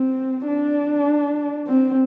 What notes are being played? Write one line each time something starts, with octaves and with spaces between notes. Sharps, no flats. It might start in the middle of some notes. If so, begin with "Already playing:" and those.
Already playing: C4
D4
C4